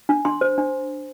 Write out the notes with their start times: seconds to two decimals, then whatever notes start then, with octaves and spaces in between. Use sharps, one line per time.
0.09 D4
0.25 D4 C6
0.41 C5
0.58 D4